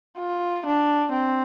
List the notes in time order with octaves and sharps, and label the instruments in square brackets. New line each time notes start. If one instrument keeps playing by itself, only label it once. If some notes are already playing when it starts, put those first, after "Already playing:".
[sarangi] F4
D4
C4